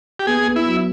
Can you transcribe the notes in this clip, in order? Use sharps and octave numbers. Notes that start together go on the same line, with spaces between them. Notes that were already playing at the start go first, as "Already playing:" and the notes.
G4
B3 G#4
B3
E4
F#3